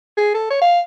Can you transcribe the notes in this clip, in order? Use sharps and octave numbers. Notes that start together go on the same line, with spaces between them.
G#4
A4
C#5
F5